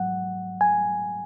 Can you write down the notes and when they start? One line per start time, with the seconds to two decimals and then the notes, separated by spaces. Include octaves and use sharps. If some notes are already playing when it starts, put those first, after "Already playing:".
Already playing: G#2 F#3 F#5
0.61 G#5